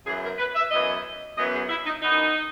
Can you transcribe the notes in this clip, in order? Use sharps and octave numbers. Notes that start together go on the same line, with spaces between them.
F#2 E3 B3 G#4
A#4
B4
E5
F#2 E3 B3 D#5
F#2 E3 B3 D#5
G#4
E4
D#4
F#2 E3 B3 D#4